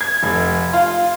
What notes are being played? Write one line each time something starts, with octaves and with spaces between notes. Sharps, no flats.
G#6
F1
F4